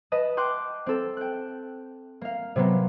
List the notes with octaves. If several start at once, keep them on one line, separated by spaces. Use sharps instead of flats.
B4 D#5 A5
G5 C6 D6 F#6
C4 A4
G5 F#6
A#3 F5
C3 F#3 A#3 B3